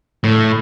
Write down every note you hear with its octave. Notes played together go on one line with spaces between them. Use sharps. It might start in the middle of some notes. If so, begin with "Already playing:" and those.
A2